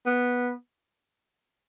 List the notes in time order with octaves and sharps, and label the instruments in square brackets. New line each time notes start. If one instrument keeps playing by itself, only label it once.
[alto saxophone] B3